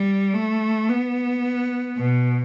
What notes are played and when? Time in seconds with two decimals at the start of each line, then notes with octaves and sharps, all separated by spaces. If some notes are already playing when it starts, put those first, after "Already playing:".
Already playing: G3
0.34 A3
0.89 B3
1.98 B2